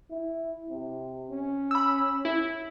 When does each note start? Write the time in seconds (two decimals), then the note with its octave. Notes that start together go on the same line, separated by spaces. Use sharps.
0.10 E4
0.69 C3
1.30 C#4
1.71 B5 E6
2.25 E4